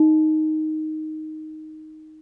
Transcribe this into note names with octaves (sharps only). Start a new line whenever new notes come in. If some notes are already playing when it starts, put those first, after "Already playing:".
Already playing: D#4